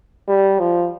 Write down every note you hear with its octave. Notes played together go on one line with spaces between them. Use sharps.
G3
F3